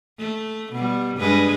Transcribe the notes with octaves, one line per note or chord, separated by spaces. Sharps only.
A3
B2 G3
G2 G#3 B4